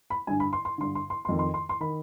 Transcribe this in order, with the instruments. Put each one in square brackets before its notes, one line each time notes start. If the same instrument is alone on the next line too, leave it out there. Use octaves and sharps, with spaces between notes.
[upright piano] B5
G2 D3 G#5
B5
C6
C6
G2 D3 C6
C6
C6
C6
F2 D#3
C6
C6
C6
D#3 B5